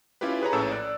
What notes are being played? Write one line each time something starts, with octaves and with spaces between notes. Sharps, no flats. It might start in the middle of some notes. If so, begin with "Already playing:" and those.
C#4 E4 F4 G4 B4
G#4 B4 C#5 A#5
A#1 A2 C#4 A4 A5 E6
D5 F#6